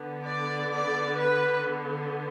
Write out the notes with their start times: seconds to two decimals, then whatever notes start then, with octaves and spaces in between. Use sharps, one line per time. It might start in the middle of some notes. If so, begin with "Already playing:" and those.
Already playing: D3 B3
0.25 D5
0.71 D5
1.17 B4